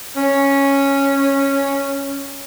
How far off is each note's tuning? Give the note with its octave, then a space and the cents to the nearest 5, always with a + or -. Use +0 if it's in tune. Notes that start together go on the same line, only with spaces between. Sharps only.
C#4 -5